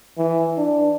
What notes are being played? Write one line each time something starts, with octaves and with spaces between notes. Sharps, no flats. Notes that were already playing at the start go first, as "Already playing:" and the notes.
E3
D4